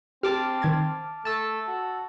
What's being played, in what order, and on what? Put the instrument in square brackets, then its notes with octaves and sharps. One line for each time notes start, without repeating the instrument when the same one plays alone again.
[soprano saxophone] C4 [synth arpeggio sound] G4 [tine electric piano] A5 D6 F6
[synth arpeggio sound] D#3 G#6 A6
[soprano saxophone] A3 [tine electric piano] A5 E6
[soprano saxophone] F#4